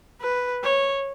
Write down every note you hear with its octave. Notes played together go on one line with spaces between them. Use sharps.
B4
C#5